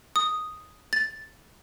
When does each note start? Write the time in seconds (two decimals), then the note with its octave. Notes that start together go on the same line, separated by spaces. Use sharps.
0.16 D#6
0.93 A6